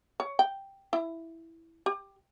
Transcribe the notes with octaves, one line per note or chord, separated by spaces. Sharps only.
C#5
G5
E4
G4